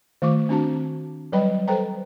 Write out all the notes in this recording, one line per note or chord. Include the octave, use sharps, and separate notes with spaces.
D#3 A3 F4 C#6 D6
C4 D4 F#4 A5
F#3 G3 B4 D#5 G5 B5
A4 B4 C5 G5 A#5